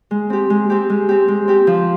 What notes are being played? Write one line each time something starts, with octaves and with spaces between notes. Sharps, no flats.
G#3
C4 G4
G#3
C4 G4
G#3
C4 G4
G#3
C4 G4
F3